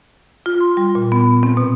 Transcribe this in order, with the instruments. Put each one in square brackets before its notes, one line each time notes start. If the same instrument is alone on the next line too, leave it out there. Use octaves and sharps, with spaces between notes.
[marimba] F4
C6
G3
A#2
B3
C4
B2